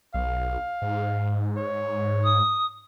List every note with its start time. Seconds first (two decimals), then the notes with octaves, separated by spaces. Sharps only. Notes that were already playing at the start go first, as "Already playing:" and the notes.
0.14 B1 F5
0.82 G#2
1.57 C#5
2.24 D#6